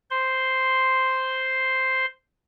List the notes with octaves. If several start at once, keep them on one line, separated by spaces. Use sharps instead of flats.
C5 C6